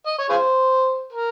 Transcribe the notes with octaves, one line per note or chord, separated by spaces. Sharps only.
D#5
C#5
F4 G#4 C5
A#4